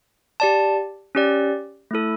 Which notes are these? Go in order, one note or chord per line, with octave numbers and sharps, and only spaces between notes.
G4 D5 A5
C#4 G4 D5
A3 E4 A4